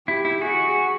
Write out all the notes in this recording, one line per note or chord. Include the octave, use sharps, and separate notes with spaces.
E4 G4
E4
F#4 G#4